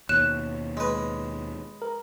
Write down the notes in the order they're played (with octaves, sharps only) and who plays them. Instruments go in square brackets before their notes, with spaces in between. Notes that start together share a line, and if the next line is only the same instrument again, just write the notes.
[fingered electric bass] D#2 B2 [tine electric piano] C#5 [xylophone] F#6 E7
[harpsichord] G#3 B4
[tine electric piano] A#4